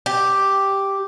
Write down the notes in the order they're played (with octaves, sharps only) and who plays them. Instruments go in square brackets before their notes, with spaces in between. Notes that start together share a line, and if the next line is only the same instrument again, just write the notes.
[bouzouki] G4